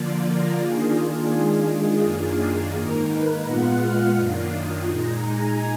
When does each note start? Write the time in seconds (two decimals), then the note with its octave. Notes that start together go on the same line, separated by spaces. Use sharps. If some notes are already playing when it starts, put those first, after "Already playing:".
Already playing: D3 F3 A#3 F4 D5
0.24 A#4
0.59 D#3 A#3 D4 F4 G#4
1.31 D#3 G#3 D4 F4 G#4
2.02 F#2 D#3 A#3 D4 F4
2.74 G#2 D#3 A#3 D#4 A#4
3.09 B4
3.44 A#2 G#3 B3 F4 F#5
3.80 F6
4.16 F#2 D#3 A#3 D4 F4
4.51 D#6
4.87 A#2 G#3 D#4 A#5
5.23 G#5